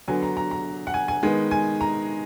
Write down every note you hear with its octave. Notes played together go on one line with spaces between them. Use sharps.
D3 F#3 B3 G#5
A#5
A#5
A#5
F#5
G#5
G#5
D#3 G#3 B3 G#5
G#5
A#5